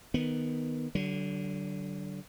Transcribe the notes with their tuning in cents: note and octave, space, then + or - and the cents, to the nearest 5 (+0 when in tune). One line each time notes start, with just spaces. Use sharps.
D#3 +0 B3 +0
D3 +0 F#3 +45